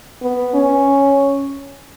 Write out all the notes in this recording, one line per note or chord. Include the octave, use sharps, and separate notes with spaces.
B3
C#4